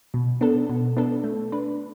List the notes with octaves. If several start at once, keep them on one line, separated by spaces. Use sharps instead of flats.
B2
B3 D4 A4
B2
B3 D4 A4
A3
D4 B4